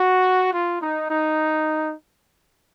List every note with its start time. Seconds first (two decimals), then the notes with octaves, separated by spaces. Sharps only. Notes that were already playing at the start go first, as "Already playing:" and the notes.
Already playing: F#4
0.53 F4
0.82 D#4
1.10 D#4